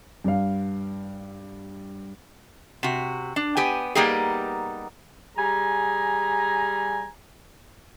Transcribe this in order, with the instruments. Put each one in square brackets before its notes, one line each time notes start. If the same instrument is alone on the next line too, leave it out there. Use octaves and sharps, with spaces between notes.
[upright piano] G2 F5
[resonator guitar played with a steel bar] C3 F#4
D4
B3 G4 G#5
G3 A#3 B3 D#4 G4 G#4
[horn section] G3 G#4 G#5 A#5